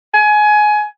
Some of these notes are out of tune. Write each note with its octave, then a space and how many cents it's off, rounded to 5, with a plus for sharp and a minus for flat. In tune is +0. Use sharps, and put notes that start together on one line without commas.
G#5 +20